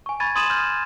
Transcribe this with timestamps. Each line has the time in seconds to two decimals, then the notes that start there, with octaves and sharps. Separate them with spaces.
0.06 G#5 C#6
0.20 B5 C#6 G#6 A6 D#7
0.35 C6 D#6 G#6 D#7 E7 F#7
0.50 F6 G6